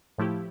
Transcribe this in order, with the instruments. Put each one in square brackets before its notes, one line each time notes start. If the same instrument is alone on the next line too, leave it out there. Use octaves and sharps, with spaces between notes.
[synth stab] A2 F3 A3 E4 G4